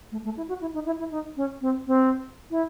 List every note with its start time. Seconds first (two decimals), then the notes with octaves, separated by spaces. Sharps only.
0.12 A3
0.24 A3
0.37 E4
0.49 F#4
0.61 E4
0.74 D#4
0.86 E4
0.99 E4
1.11 D#4
1.37 C#4
1.61 C4
1.87 C4
2.51 E4